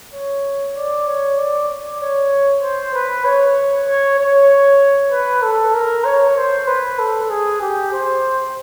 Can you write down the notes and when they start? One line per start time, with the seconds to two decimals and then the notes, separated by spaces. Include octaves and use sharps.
0.13 C#5
0.76 D5
1.06 C#5
1.38 D5
1.69 D5
2.00 C#5
2.62 C5
2.94 B4
3.25 C#5
3.87 C#5
4.19 C#5
5.12 B4
5.43 A4
5.74 A#4
6.05 C#5
6.37 C5
6.67 B4
6.99 A4
7.30 G#4
7.61 G4
7.92 C5